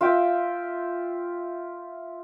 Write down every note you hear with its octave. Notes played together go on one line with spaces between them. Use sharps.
F4 E5 G5